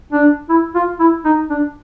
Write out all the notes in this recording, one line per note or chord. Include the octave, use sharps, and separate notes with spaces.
D4
E4
F4
E4
D#4
D4